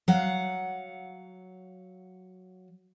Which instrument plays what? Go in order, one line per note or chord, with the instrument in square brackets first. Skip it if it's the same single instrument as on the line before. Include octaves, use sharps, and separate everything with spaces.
[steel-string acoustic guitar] F#3 F5 F#5